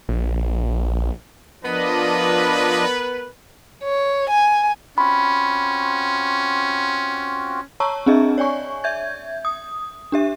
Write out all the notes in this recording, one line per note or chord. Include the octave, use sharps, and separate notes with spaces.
A#1
F3 B3 D4 A#4 B4 D#5
C#5
G#5
C4 C#4 F4 F#4 B5
C#5 A5 A#5 C#6 E6
C4 D4 G#4 D#5 E5
C#5 D5 G#5 C#6
E5 G6 G#6
D#6
D4 G4 E5